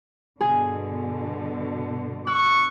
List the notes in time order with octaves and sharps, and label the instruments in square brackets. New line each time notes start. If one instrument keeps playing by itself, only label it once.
[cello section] G2 B2 D3 [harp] G#4 G#5
[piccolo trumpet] C#6 [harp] E6 F#6